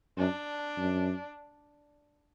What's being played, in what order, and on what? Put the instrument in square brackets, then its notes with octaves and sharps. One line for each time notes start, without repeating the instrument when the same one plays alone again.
[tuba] F#2 [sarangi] D4
[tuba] F#2